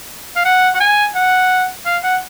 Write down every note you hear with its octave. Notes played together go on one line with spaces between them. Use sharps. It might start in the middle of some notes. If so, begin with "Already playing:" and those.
F5
F#5
F#5
G#5
F#5
F5
F#5